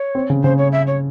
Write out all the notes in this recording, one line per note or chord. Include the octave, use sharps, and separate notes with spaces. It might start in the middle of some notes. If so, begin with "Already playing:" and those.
Already playing: C#5
C4
C#3
C#3 C5
C#5
E5
C#5